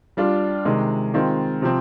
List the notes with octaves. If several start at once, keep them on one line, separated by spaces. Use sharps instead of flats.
G3 D4 F4
C3 D#3 G#3
D#3 G#3 C4 F4
C3 F3 C4